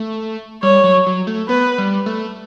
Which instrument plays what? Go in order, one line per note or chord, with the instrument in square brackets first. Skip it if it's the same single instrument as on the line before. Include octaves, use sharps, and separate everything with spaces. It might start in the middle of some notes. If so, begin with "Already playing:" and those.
Already playing: [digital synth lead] A3
[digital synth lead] G3 [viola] C#5
[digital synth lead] F#3
F#3
A3
[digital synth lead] B3 [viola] B4
[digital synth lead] G3
A3